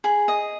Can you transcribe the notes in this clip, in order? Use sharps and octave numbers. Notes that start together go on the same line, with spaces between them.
G#4 B5
D#5 D#6